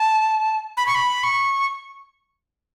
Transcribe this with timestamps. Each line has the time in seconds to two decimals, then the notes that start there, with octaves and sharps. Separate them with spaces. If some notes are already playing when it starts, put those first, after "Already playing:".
Already playing: A5
0.77 B5
0.87 C#6
0.95 B5
1.24 C#6